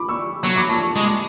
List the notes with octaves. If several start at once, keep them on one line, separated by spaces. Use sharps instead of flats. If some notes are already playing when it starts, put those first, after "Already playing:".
Already playing: B5 D6
C#6 E6
F#3 C#6 E6
B5 D6
A5 C#6
A5 C#6
G#3 C#6
D6